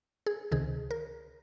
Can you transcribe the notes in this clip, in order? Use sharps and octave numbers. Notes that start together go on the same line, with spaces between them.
G#4
C#2 C3 D#3 G#4
A#4